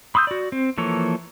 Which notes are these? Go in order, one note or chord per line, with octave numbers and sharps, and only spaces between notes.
B5 C6 D#6 E6 G6
F#4 D5
C4
E3 F3 A#3 A4 C#5